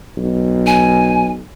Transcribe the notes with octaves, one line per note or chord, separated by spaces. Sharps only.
B1
G#5